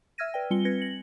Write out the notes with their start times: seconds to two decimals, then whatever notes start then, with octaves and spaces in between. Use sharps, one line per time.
0.18 E5 E6 F6 G#6 A#6 D#7
0.34 B4 D5 G5
0.50 G3 C4 F4 G#5 C#7 G7
0.65 C4 B4 G#6 A#6 C#7
0.82 F#7